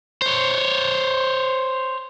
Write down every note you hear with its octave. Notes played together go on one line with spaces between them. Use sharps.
C5 C#5